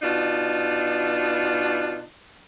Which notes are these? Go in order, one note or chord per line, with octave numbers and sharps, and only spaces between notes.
B2 D4 D#4 F4